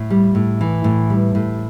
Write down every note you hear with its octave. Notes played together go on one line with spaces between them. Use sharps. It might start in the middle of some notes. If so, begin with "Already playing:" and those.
Already playing: A2
G3
A2
E3
A2
G3
A2